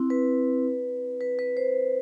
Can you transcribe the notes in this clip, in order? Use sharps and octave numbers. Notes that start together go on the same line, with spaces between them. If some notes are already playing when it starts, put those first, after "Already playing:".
Already playing: C4 E4
B4
B4
B4
C5